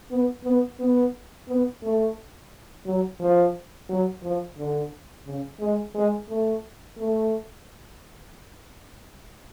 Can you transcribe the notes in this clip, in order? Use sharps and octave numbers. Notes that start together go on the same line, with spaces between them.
B3
B3
B3
B3
A3
F#3
F3
F#3
F3
D3
C#3
G#3
G#3
A3
A3